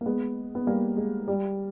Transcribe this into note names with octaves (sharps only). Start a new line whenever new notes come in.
A#3
G#3 B3
B3
G3 A#3
G#3
G3